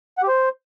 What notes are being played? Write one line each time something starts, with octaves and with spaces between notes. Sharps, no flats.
F#5
G4
C5